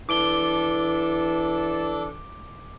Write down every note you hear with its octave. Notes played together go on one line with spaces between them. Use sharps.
E3 D4 A4 D6 D7 G7